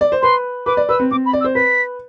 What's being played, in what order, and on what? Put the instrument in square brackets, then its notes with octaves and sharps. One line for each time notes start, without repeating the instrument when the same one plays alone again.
[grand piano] D5
C5
[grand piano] B4 [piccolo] C6
[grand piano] B4 [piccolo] D6
[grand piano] D5
[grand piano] B4 [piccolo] E6
[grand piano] C4
[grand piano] C4 [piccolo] D6
[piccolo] B5
[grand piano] D5
[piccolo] E6
[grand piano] C5
[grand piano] B4 [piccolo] B6